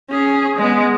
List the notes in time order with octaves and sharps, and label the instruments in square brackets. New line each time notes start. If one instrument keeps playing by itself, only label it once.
[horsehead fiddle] C#4 G#4
G#3 B3